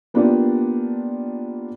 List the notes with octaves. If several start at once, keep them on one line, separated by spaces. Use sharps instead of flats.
A#3 B3 D4 F4 G4 D5